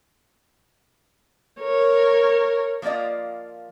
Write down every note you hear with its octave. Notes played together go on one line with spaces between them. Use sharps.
A#4 C#5
F3 A#3 F4 D5 D#5